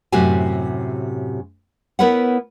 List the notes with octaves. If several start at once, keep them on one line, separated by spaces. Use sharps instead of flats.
F#2 A2 C3 F#4 G4 G#5
B3 E4 A#4 B4 C#5 F#5